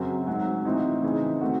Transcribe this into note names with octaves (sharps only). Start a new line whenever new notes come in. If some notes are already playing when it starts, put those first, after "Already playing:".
Already playing: F#2 C#3 F#3 C4 F#4
G#2 F#3 C4 F#4
A2 E3 C4 D#4
C#3 E3 C4 D#4
D#3 A3 C4 F#4